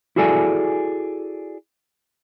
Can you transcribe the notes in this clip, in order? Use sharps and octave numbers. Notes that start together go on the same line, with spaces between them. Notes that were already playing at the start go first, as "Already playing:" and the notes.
E4 F#4 G#4 A4 D5 G#5